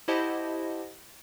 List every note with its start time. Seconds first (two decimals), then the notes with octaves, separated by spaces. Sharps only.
0.08 E4 G4 C5 D#5 F#5 A5